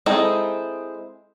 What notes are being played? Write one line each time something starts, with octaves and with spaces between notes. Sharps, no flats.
G#3 C4 D#4 E4 A4